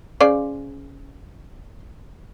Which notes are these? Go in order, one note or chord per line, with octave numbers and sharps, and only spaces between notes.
C#3 C5 D5